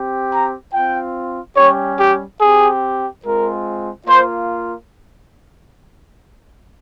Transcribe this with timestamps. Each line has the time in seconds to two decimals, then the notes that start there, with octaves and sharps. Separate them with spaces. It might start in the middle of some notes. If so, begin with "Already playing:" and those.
Already playing: C4 G4
0.32 A#5
0.73 C4 F4 G5
1.56 G3 C#4 G4 C#5
1.99 G4
2.41 C4 G4 G#4
3.24 G#3 C4 F4 A#4
4.07 A#3 F4 C5